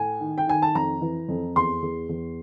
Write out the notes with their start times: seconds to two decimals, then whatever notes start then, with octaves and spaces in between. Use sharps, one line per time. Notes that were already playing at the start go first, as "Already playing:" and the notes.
Already playing: A2 G#5
0.20 D#3
0.38 G5
0.47 D#3 G#5
0.62 A5
0.75 F2 A#5
1.01 E3
1.28 F2
1.56 E2 C6
1.82 E2
2.09 E2